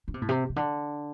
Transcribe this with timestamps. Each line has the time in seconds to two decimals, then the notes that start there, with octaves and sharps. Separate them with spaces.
0.08 D3
0.14 C3
0.22 A2
0.29 C3
0.49 C3
0.56 D3